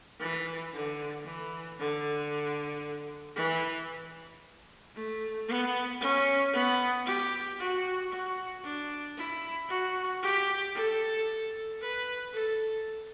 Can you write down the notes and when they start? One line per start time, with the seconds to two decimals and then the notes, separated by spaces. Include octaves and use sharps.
0.20 E3
0.73 D3
1.25 E3
1.79 D3
3.36 E3
4.95 A3
5.48 B3
6.01 C#4
6.53 B3
7.06 G4
7.58 F#4
8.11 F#4
8.65 D4
9.17 E4
9.69 F#4
10.22 G4
10.75 A4
11.81 B4
12.33 A4